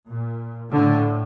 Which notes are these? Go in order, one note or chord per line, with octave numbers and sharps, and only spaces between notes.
A#2
A2 D3